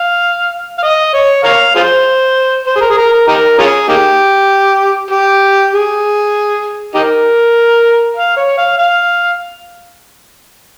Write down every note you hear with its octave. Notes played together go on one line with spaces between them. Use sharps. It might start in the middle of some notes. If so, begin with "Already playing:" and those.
Already playing: F5
F5
D#5
C#5
A#4 C#5 F5
F4 G#4 C5
C5
G#4
A#4
G#4
A#4
A#4
D#4 G4 A#4
C#4 F4 G#4
A#3 D#4 G4
G4
G#4
D#4 G4 A#4
F5
C#5
F5
F5